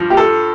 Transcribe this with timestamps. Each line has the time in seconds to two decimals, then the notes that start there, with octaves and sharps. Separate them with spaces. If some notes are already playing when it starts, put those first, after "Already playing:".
Already playing: G2 F3
0.10 G4
0.17 A4